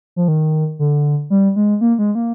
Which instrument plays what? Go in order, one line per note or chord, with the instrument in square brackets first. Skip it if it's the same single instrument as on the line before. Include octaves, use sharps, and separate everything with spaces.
[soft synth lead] F3
D#3
D3
G3
G#3
A#3
G#3
A#3